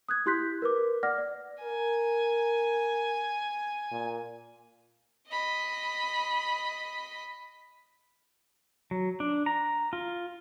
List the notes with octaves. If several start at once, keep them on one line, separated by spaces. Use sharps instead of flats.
D#6 F#6 G#6
E4 G4 C6 F#6 G6 B6
A#4 B4 D6
D5 F#5 D6 F6 A#6
D5
A#4 G#5
A#2
D#5 B5
F#3
D4
A#5
F4